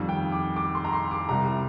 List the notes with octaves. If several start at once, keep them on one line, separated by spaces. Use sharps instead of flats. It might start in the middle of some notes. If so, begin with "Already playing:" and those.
Already playing: F2 D#3 G3
G5
D6
D6
C6
A#5
C6
D6
C2 C3 G3 A#5